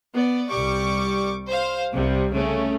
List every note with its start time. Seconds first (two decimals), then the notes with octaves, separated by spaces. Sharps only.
0.14 B3 D5
0.51 C2 G3 C#6 D6
1.48 C5 F5
1.93 C2 C3 G3
2.35 C#3 A3 C#4